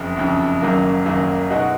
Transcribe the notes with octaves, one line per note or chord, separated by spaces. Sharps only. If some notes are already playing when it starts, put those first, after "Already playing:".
Already playing: F#1 F2 C#3
F#1 F2 C#3
G#1 F#2 C#3 F#3 A#3
G#1 F#2 C#3 F#3 A#3
B2 G#3 D#4 F#4